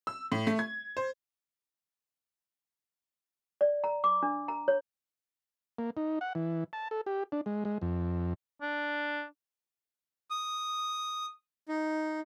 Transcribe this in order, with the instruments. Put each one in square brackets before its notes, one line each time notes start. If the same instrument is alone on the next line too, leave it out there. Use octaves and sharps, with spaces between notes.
[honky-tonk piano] E6
A2
A3
G#6
C5
[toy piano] D5
A#5
D6
D4
A#5
C#5
[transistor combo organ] A#3
D#4
F#5
E3
A5
A4
G4
D4
G#3
G#3
F2
[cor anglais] D4
[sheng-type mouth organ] D#6
D#4